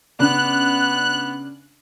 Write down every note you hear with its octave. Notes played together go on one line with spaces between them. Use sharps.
C#3 B3 D4 F#6